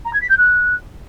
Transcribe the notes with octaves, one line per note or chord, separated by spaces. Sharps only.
A#5
G#6
B6
G6
F#6